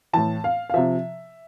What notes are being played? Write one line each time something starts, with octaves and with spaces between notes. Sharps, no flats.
A2 E3 A5
F5
F5
C3 F3 E5